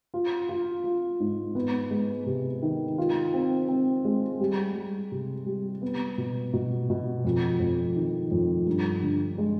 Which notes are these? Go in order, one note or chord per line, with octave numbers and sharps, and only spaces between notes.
F4
F4
F4
G#2
B3
G#3
C3
D#3
F4
C4
C4
G#3
G3
G3
C3
G3
B3
B2
B2
B2
F2
F2
D#3
F2
G2
D3
G#3